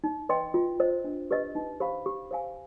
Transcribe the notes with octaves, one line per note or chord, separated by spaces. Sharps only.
D#4
B4 D#5 G5 C6
F4
C5 D#5
D4
G4 B4 D#5
D#4
G4 C5 F5 B5
G4
C5 F5 G#5